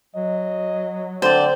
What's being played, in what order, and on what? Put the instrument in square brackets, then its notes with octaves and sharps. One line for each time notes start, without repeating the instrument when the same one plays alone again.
[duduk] F#3 [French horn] D#5
[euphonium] D3 [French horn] C4 [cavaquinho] C5 D5